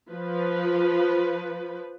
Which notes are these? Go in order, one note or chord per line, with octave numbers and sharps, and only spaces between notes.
F3 B4